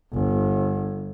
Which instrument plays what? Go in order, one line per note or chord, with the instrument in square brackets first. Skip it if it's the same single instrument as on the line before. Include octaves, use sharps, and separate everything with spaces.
[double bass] G1